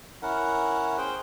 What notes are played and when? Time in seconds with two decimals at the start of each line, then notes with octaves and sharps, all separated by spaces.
0.22 C#4 E4 A#4 F#5
0.98 G#4 C5 G5